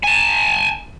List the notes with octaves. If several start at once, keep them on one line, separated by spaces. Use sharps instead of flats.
G#5 A5